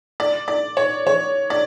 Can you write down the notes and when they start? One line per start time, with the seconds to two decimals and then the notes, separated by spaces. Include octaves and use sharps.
0.20 D5
0.48 D5
0.77 C#5
1.07 C#5
1.50 D5